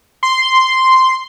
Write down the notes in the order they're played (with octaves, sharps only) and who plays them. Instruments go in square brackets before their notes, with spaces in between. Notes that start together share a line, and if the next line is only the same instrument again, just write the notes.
[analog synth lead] C6